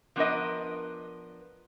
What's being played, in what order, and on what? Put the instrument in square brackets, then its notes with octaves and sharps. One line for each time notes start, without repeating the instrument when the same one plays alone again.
[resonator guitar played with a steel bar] F3 B3 D4 A#4 B4 D#5